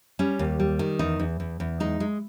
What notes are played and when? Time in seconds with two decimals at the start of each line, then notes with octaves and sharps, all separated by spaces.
0.19 G3 C#4
0.39 D#2
0.60 G3
0.79 D#3
0.99 E2 D#4
1.20 E2
1.40 E2
1.60 E2
1.80 G#3 D#4
2.00 G#3